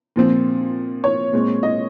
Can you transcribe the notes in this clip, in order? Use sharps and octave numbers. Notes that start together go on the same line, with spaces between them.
A#2 F3 C4
C#5
A#2 G#3 C4
D#5